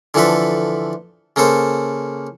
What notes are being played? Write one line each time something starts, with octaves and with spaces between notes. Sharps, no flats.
D3 E3 F3 A4 B4
C#3 A#3 A4 C5